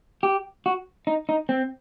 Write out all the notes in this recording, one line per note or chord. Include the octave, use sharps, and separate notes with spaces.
G4
F#4
D#4
D#4
C4